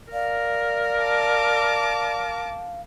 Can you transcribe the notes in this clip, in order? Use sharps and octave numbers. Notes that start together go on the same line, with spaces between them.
A#4 D5 F5
A5 D6